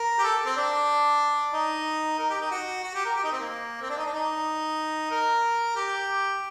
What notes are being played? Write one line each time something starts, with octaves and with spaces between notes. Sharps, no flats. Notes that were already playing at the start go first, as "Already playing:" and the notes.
Already playing: A#4
G4
A4
C4
D4
D#4
A#4
G4
D#4
F#4
F#4
G4
A#4
G4
D#4
C4
A#3
C4
D4
D#4
D4
D#4
A#4
G4